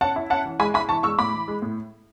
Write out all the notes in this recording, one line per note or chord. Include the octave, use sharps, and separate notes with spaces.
C#4 F#5 A5
E4
C#4 F#5 A5
E3
G#3 G#5 B5
E4 G#5 B5
E3 A5 C#6
G#3 C#6 E6
A2 B5 D6
E3
G#3
A2